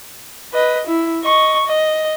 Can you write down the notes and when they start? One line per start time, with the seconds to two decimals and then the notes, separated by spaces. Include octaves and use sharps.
0.53 B4 D#5
0.87 E4
1.23 D#5 C#6
1.67 D#5